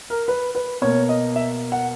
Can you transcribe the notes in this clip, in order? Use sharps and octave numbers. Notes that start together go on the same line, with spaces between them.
A#4
B4
B4
B2 A#3 C#5
D#5
E5
F#5